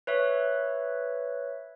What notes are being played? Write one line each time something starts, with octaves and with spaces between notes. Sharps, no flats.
B4 C#5 E5